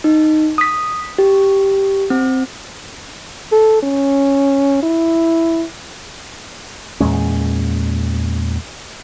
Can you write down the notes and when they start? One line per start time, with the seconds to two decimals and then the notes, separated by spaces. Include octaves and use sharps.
0.04 D#4
0.58 D#6 B6
1.18 G4
2.10 C4
3.52 A4
3.83 C#4
4.83 E4
7.00 E2 A#2 G#3 C#4